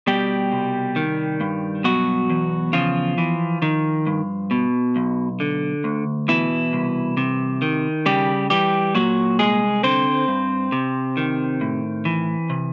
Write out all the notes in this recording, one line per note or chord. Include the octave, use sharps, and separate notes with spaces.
B2 G3 G4
C2
D#3
G2
B2 F#3 F#4
E2
C#3 F3 F4
E3
D#3
G2
B2
B1
D3
D2
B2 E3 E4
C2
C3
D#3
C#3 G3 G4
E3 G3 G4
A#2 F#3 F#4
C2 G#3 G#4
D3 C4 C5
G2
C3
D#3
A2
E3
C3